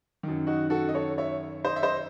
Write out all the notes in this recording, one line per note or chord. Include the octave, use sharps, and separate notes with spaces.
F#2 D#3
D#4 F#4
F#4 A4
D#5
A4 C#5
C#5 E5
C5 D#5
E5
C5 D#5